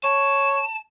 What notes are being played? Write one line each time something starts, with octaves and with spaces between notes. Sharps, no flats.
C#5 A5